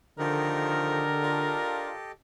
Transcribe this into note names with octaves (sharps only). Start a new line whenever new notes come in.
D3 D#3 F3 G4 A4 A#4 D#5
D4 F4